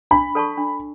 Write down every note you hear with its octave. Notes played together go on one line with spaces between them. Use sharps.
D4 B5
A4 D5 A5 C#6
D4